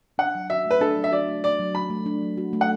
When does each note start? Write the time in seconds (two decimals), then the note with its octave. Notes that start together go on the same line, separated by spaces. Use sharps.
0.18 D4 F#5
0.35 F#3
0.50 F#4 E5
0.65 A3
0.71 B4
0.81 D4 A4
0.97 F#3
1.04 E5
1.12 F#4 D5
1.28 A3
1.44 D4 D5
1.59 F#3
1.75 F#4 B5
1.90 A3
2.06 D4
2.22 F#3
2.37 F#4
2.53 A3
2.61 F#5